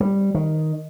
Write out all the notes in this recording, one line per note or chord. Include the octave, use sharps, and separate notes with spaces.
G3
D#3